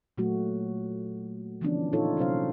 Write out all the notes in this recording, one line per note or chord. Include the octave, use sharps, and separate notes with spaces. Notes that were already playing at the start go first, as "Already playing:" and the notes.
A#2 F#3 A3 F#4
D3 E3 F3 B3 C#4 D4
A#2 D#4 F4 A4 C#5
C3 F#3 C#4 C5 F5